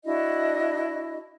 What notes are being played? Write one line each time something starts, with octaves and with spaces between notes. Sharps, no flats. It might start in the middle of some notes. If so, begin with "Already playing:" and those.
D4 E4 F#4 D#5